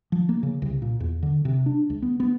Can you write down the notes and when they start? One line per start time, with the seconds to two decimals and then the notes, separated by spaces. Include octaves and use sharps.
0.12 F3
0.29 A#3
0.43 C#3
0.62 C2
0.82 A#2
1.00 E2
1.23 D3
1.45 C3
1.66 D4
1.90 C#2
2.02 B3
2.20 B3